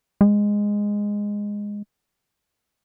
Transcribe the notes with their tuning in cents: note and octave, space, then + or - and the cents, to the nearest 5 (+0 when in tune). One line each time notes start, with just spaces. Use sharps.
G#3 -10